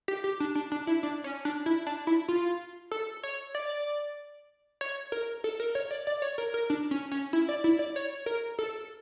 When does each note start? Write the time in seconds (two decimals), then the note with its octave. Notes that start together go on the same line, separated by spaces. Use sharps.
0.08 G4
0.24 G4
0.40 D4
0.55 D4
0.72 D4
0.87 E4
1.03 D4
1.24 C#4
1.45 D4
1.66 E4
1.87 D4
2.07 E4
2.28 F4
2.91 A4
3.23 C#5
3.55 D5
4.81 C#5
5.12 A#4
5.44 A4
5.60 A#4
5.75 C#5
5.91 D5
6.07 D5
6.22 C#5
6.38 A#4
6.54 A#4
6.70 D4
6.91 C#4
7.12 C#4
7.33 E4
7.49 D5
7.64 E4
7.79 D5
7.96 C#5
8.26 A#4
8.59 A4